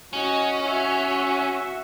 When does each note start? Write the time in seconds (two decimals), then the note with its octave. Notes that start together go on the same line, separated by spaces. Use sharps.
0.13 C#4 F#4 D#5
0.62 F#4 E5